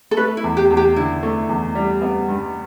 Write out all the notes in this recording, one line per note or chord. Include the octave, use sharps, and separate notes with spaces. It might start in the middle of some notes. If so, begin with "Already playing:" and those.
A4
A3 B4
E4
E2
G4
E2
G4
D3 E4
A3
E2
G3
B3
G2